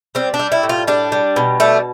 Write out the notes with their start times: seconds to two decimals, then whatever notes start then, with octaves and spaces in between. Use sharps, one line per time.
0.15 G3 C4
0.34 D4
0.39 G3
0.52 E4
0.63 A2
0.69 F4
0.87 G3 D4
1.12 G3
1.36 B2
1.60 G3 A3